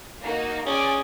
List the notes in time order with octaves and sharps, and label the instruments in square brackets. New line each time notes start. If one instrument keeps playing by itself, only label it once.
[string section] A#3 D#4 F#4
[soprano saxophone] C#4 [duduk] G#4 [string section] D5 G#5 D6